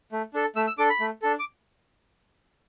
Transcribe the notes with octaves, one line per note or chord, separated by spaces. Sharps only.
A3
D4 A4
A3 E6
E6
D4 A4 D6
B5
A3
D4 A4
D6